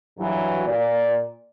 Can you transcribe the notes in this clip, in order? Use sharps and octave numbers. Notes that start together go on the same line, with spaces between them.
G2 E3 F#3
A#2 D5